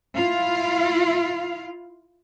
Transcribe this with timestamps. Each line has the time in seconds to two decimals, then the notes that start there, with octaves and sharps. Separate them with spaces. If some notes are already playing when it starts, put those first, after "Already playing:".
0.15 E4 F4 F5